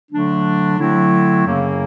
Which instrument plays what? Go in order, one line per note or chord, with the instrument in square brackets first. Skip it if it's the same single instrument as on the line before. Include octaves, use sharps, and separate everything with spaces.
[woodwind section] D3 F#3 A3 D4
D3 F#3 A3 C4 E4
F#2 C#3 F#3 A#3